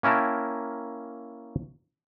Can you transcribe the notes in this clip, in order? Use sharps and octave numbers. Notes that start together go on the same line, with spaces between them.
A#3 C#4 E4 A#4 G5 A5